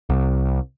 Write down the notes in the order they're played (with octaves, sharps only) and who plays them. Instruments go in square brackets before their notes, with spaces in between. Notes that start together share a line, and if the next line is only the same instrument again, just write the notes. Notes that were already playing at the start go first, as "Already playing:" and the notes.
[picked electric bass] C2